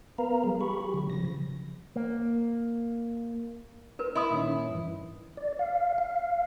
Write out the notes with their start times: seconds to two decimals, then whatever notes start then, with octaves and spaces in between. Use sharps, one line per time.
0.18 B3 A#4 B4 F5 A#5
0.44 F#3 G3 G#4
0.61 G4 G#4 B5 C#6
0.81 G4
0.94 D3 F#3
1.10 C#3 F3 A#6
1.96 A#3
3.99 A#4 B4
4.15 E4 D#5 B5 D#6
4.31 A#2 D#3 C#4
4.69 G2 E3
5.37 D5
5.59 F5
5.98 F5